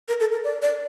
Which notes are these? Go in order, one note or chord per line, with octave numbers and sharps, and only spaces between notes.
A#4
A4
A#4
D5
D5